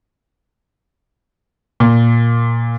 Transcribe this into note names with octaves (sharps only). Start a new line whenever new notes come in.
A#2